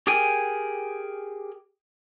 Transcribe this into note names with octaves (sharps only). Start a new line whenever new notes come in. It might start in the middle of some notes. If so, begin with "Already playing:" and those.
G4 G#4 A#4 G5 G#5